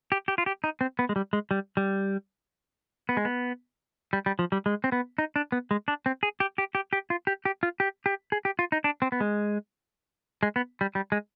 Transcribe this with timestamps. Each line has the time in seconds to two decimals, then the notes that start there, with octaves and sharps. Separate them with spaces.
0.12 G4
0.28 G4
0.38 F4
0.46 G4
0.64 D#4
0.81 C4
0.99 B3
1.09 G#3
1.16 G3
1.33 G#3
1.51 G3
1.77 G3
3.09 B3
3.17 G#3
3.25 B3
4.13 G3
4.26 G3
4.39 F3
4.52 G3
4.66 G#3
4.84 C4
4.92 B3
5.18 D#4
5.36 D4
5.52 B3
5.71 G#3
5.88 D4
6.06 C4
6.23 G#4
6.40 G4
6.58 G4
6.75 G4
6.93 G4
7.10 F4
7.27 G4
7.45 G4
7.63 F4
7.80 G4
8.06 G4
8.32 G#4
8.45 G4
8.59 F4
8.72 D#4
8.84 D4
9.02 C4
9.12 B3
9.20 G#3
10.43 G#3
10.56 B3
10.81 G3
10.95 G3
11.12 G#3